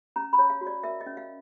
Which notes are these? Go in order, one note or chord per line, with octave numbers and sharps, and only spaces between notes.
C#4 A#5
B5
C#5
F5
F#4
D5
A#4 E5
D#5
C#4
F5